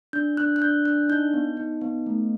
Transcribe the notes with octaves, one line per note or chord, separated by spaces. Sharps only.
D4 G6
D4 F#6
F#6
D4 G6
D4 F#6
D#4 G6
B3
D#4
B3
A3